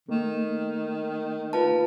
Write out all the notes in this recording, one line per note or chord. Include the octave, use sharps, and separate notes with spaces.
D#3 A3 A#3
F4 B4 A5